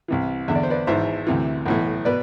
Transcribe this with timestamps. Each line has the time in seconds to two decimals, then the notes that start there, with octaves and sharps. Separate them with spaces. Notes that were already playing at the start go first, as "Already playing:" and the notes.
0.08 C2 C3 E3
0.48 E2 D3 E5
0.55 D5
0.63 C5
0.70 B4 D5
0.87 G#1 G#2 E3 C5 E5
1.27 D2 C3 E3
1.66 B1 A2 E3
2.05 B2 B4 D5